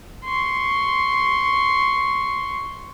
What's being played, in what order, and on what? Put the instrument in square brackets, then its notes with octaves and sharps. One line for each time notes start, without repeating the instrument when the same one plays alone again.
[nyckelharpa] C6 C#6